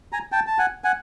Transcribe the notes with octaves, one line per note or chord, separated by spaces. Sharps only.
G#5 A#5
G5 A5
A5
F#5 G#5
F#5 G#5